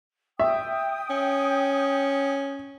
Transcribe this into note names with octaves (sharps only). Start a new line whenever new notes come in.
E5 G5 D#6
C#4